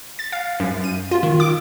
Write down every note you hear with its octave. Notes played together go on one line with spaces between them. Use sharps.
A6
F5
F#2
D#7
F4
D#3
D6